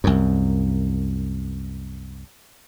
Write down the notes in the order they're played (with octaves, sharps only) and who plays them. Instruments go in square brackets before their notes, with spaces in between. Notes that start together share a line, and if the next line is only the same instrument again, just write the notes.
[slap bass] C2 F#2